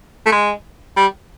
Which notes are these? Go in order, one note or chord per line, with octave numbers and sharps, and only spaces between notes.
A3
G#3
G3